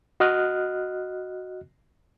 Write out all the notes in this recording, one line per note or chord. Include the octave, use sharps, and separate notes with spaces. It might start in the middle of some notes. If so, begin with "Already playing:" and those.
F#4 D#5 F6 F#6